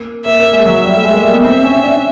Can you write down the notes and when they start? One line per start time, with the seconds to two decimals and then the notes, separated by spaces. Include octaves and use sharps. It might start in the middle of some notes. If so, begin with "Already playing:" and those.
Already playing: A#3
0.25 A#3 E5
0.39 A#3
0.53 G#3
0.65 F#3 E5
0.84 G3
0.97 A3
1.04 G#3
1.14 A#3
1.24 G3
1.33 B3
1.44 C4 E5
1.63 C#4
1.83 D4